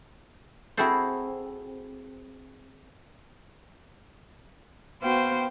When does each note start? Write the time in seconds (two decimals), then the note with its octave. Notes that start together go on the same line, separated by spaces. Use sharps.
0.77 C4 E4 F#4 G#4 A4 C5
5.02 B3 F#4 C5 F5 G5